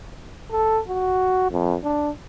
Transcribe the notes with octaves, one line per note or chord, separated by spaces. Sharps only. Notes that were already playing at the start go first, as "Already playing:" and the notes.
A4
F#4
F2
D4